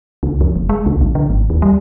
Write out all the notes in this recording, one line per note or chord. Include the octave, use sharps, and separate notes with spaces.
C#2
F2
F1
G#3
C#2
A#1
D3
G#1
D#2
G3